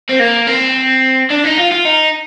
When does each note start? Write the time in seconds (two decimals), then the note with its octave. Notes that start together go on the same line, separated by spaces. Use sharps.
0.09 C4
0.20 A#3
0.47 C4
1.30 D4
1.44 D#4
1.58 F4
1.72 F4
1.85 D#4